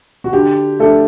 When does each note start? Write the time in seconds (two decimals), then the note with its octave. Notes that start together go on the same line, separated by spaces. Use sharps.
0.24 F#4
0.33 D3 G4
0.79 A3 D4 A4